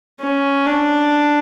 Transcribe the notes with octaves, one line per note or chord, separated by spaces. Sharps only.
C#4
D4